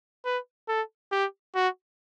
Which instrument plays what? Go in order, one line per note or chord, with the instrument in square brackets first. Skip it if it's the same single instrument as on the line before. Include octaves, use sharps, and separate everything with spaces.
[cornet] B4
A4
G4
F#4